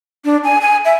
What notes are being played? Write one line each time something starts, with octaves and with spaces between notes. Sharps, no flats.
D4
G#5
G#5
E5